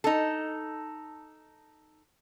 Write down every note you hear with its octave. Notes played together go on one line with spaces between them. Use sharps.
D#4 A4